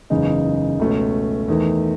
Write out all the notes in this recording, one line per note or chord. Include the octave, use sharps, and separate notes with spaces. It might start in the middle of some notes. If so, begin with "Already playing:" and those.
F#1 E2 C#3 G#3 D#4
C#2 B2 A3 C#4
E2 D#3 A3